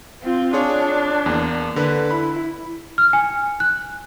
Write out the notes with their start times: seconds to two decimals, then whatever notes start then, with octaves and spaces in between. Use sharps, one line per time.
0.23 C4 F4
0.53 D4 F4 G#4 C#5
1.26 E2 A#3
1.76 D3 B4
2.11 E4 B5
2.98 F6
3.13 G#5
3.60 F#6